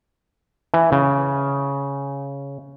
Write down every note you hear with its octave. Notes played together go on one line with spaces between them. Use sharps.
E3
C#3